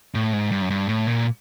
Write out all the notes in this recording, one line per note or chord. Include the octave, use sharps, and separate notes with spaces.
A2
G#2
G2
F#2
G2
A2
A#2